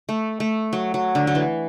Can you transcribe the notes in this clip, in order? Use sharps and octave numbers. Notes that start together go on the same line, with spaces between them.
A3
A3
F#3
F#3
D3
F#3
E3